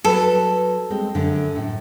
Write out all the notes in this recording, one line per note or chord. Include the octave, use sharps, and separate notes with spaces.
F#3 A4 B4
G#3 C4
F#2 D3
F#2 A2